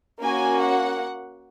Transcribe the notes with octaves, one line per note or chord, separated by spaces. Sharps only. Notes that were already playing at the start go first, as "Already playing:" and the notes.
A#3 C#4 F#4 G#5
F#5